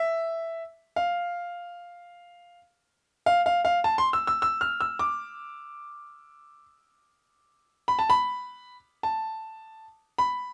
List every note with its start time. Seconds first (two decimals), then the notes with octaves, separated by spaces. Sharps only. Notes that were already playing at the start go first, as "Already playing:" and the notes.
Already playing: E5
0.96 F5
3.26 F5
3.46 F5
3.65 F5
3.84 A5
3.98 C6
4.13 E6
4.27 E6
4.42 E6
4.61 F6
4.81 E6
4.99 D6
7.88 B5
7.99 A5
8.10 B5
9.03 A5
10.18 B5